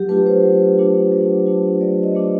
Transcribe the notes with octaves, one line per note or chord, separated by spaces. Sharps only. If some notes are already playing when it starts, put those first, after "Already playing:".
Already playing: F#3 G4
A3 D4 F4 B4
C5
F#3
A3 D4 F4
F#3
A3 D4 F4
F#3 D5
D#5
A3 D4 F4